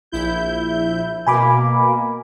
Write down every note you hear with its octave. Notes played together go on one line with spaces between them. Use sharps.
A#1 E4 G6
B2 A#3 G#5 B5 D6